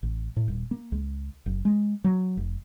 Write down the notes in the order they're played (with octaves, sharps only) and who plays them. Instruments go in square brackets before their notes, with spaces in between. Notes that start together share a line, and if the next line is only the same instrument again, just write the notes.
[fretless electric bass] A1
A2
D#1
A#3
C#2
F#1
G#3
F#3
F1